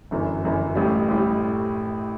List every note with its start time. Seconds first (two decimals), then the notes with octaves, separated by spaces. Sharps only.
0.11 G1 F#2 E3
0.44 G1 F#2 E3
0.75 A1 A2 G3
1.08 A1 A2 G3